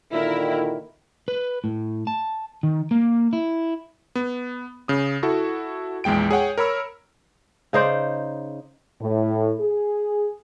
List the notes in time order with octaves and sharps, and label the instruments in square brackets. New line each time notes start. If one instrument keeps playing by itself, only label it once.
[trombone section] A#2 D3 D#3 [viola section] E4 A#4
[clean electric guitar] B4
A2
A5
D#3
A#3
E4
[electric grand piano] B3
C#3 D#6
E4 F#4 A4
A#1 E2 G#3 G5 D7
G#4 C#5 F#5 G5
A#4 C#5 B5 E6
[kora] C#3 D#4 C5 D5
[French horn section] A2
G#4